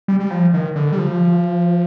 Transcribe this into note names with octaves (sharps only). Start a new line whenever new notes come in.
G3
G3
F3
D#3
D3
G3
F3